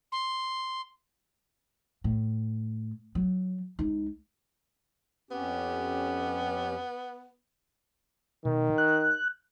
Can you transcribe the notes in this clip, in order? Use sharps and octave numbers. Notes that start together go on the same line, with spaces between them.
C6
A2
F#3
C#2 D#4
F2 B3 C#4 G4
B2 D#3
F#6